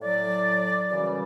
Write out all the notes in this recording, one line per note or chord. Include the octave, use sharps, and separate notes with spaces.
A2 F#3 D5
F#2 C#3 E3 G3 D5